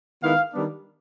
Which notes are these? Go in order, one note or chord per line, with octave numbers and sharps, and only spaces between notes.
D#3 G#3 B3 E4 F5
D#3 G3 B3 D4